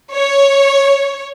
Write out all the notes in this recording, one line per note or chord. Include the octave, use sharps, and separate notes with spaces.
C#5